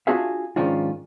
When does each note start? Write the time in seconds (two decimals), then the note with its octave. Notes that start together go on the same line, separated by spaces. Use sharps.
0.07 D4 F4 F#4 G#4 E5 F5
0.56 G#2 D#3 F3 C#4 D4 F4